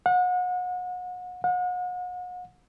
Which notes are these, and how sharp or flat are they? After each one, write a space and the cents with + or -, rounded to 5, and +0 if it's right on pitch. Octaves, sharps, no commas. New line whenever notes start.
F#5 -35
F#5 -40